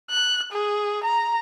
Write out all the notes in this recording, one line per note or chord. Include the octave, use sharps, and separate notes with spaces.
F#6
G#4
A#5